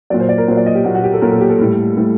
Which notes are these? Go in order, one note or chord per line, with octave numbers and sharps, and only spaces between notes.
A#2 F#3 D5
C5
D5
A#4
A#2 F#3 C5
D5
D#5
G4
A#2 F#3 F#4
F#4
G4
A4
A#2 F#3 A#4
A4
G4
A4
A2 G3
A2 G3